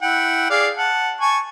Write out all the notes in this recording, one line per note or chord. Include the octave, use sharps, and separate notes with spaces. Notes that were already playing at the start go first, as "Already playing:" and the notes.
E4 F#5 G5
G#4 D5 F5
F#5 A5
G#5 A5 C#6